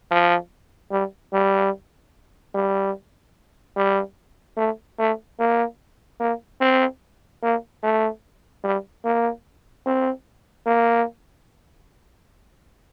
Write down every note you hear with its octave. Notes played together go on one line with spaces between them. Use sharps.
F3
G3
G3
G3
G3
A3
A3
A#3
A#3
C4
A#3
A3
G3
A#3
C4
A#3